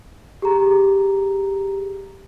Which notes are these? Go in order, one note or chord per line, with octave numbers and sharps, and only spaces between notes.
G4 G#4 A#5